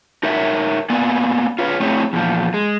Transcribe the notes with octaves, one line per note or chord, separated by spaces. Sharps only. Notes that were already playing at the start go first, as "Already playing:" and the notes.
D#4 A#4 C#5 E5
A#3 B3 D5 G#5
F4 B4 C#5
A3 C4 E4 G#4 C#5
E2 A#2 F3
G#3